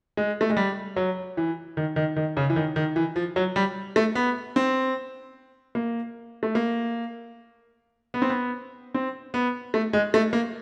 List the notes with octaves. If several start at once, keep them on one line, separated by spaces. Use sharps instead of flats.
G#3
A3
G#3
G3
F#3
E3
D#3
D#3
D#3
C#3
E3
D#3
D#3
E3
F3
F#3
G3
A3
B3
C4
A#3
A3
A#3
B3
C4
B3
C4
B3
A3
G#3
A3
A#3